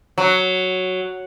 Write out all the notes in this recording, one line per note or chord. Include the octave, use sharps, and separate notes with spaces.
F#3